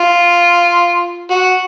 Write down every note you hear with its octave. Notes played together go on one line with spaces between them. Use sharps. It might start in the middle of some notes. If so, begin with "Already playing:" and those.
Already playing: F4
F#4